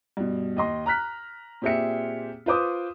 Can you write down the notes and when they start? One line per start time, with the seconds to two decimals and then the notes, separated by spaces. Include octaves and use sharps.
0.17 G2 B2
0.56 D#2 D#5 C6
0.86 A#5 F6 F#6 B6
1.62 A#2 C4 G4 G#4 E5 C#7
2.46 F4 B4 C5 D6 D#6